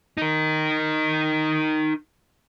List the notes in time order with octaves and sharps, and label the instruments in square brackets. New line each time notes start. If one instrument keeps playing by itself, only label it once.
[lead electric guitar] D#4 A#4